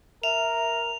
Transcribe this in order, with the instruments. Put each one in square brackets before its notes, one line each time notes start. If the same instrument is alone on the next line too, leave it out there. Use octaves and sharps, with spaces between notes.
[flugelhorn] A#4 [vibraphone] E5 [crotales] F7